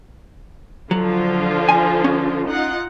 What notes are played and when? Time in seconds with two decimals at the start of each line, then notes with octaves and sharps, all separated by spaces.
0.91 D3 F3 F#3 F4
1.69 G#5
2.04 C#4
2.46 D#4 F4 F#5